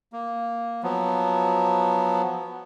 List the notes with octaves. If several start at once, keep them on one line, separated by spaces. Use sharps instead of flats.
A#3
F3 F#3 B3